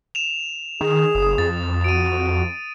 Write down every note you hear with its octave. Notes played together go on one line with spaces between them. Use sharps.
E7 F7
D#3 G#4
F#1 D#6
F2 A6
F#4 D7 D#7